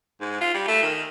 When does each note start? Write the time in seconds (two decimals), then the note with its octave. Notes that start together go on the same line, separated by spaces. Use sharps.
0.20 G#2
0.41 F4
0.54 G3
0.68 A3
0.82 D#3